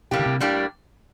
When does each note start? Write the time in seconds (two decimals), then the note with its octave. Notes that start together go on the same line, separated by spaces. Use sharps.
0.11 A2 C3 G3 A#3 D4 G4
0.19 D3
0.26 C3
0.40 A2 G3 A#3 D4 G4